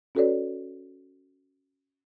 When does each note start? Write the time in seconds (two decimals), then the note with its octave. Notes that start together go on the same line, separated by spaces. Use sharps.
0.15 C#4 F#4 A4 B4 C#5 D5